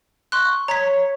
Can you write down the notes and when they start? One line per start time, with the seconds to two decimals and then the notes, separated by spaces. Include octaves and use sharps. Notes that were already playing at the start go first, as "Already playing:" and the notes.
0.32 C6 C#6 F#6
0.68 C#5 A#5 G#6 B6